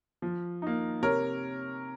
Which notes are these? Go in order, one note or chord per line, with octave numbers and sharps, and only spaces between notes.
F3
A#3 D#4
C3 A#4 C#5